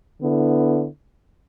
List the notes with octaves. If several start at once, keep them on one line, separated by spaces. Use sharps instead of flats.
D3 B3 E4